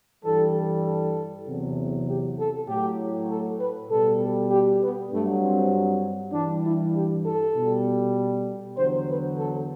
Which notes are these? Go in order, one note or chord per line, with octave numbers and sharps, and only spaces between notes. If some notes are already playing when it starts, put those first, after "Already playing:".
G2 E3 G3 A4
A4
E2 C3 F#3
G4
A4
A2 F#3 G4
A4
B4
B2 G3 A4
G4
B3
G2 F#3 A3
C4
G2 E3 G3 D4
E4
G4
A4
B2 G3
E2 D3 F#3 C5
B4
A4